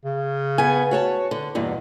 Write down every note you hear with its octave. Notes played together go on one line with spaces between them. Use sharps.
C#3
B3 G#5
F#4 C#5 A5
D3
E2 G2 B2 A#3